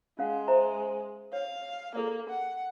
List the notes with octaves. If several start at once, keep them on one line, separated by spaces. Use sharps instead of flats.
G#3 C#4 F5 F#5
C5 E5 A#5
C#5 F5
A#3 G#4 A4 D5
F#5